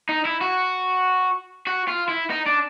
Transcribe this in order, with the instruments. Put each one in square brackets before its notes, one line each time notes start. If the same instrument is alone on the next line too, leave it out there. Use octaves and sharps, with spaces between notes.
[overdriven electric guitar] D#4
E4
F#4
F#4
F4
E4
D#4
D4